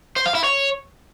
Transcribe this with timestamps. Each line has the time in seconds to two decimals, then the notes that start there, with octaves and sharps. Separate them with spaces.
0.16 C5
0.26 F5
0.35 E4
0.44 C#5